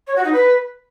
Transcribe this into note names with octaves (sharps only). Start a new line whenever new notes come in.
C#5
F#4
D#4
B4